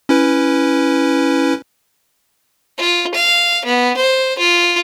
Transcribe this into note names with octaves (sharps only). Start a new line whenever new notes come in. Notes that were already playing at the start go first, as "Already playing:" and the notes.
C#4 E4 B4
F4
F5
B3
C5
F4